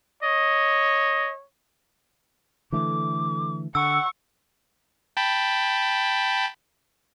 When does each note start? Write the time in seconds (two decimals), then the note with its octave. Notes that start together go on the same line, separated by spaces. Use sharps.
0.23 C#5 D#5
2.72 D3 E3 A3 D6
3.75 D3 F#5 C#6 E6
5.17 G5 A5 B5